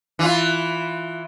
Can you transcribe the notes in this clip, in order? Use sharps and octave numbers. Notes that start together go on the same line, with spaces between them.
E3 F4